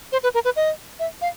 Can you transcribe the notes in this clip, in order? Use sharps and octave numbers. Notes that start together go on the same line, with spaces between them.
C5
B4
A#4
B4
D#5
E5
F5